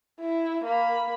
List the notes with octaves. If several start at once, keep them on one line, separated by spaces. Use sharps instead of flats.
E4
A#3 B5